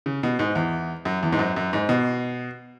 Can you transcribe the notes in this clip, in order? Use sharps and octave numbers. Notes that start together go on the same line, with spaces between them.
C#3
B2
G#2
E2
F#2
E2
G#2
F#2
F#2
G#2
B2